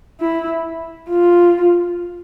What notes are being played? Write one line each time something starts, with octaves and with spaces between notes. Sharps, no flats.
E4
F4